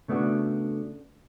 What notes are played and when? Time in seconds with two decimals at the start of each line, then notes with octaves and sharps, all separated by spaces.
0.08 C#3 A3 B3 D4 F#4